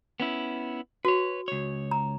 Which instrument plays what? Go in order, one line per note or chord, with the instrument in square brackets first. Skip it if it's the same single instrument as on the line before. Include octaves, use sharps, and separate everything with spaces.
[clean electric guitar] B3 C#4 E4
[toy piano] F#4 [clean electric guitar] B4 C#5
[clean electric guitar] C#2 C#5
[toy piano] A#5